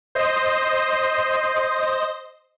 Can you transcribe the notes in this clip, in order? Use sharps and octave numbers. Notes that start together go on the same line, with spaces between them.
C5 D#5